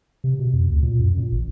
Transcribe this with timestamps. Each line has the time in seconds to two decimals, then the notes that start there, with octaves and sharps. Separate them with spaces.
0.24 C3
0.39 B2
0.53 F2
0.70 D2
0.82 A#2
0.99 F#2
1.17 A#2
1.32 A1